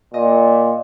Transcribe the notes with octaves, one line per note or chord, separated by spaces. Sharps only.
A#2 D#5